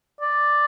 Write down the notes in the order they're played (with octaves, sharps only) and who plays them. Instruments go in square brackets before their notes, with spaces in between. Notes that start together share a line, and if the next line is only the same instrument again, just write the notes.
[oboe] D5